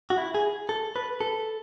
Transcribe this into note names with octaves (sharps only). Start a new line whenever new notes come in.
F#4
E4
G#4
A4
B4
A4